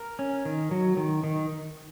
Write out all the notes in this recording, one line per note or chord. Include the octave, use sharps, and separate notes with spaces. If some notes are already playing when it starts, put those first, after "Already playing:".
Already playing: A#4
C#4
D#3
F#3
D#3
D#3